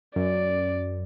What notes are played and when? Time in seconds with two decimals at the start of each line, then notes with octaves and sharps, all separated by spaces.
0.16 F#2 D5